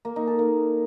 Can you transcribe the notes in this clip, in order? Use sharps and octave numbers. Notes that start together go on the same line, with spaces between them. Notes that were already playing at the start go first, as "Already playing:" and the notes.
A#3
D#4
A4
A#3